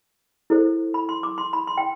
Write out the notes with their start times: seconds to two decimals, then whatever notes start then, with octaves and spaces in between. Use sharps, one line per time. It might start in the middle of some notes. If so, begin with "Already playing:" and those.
0.50 E4 A4 C5
0.94 B5
1.09 C6
1.23 D6
1.38 C6
1.53 B5
1.67 C6
1.78 G5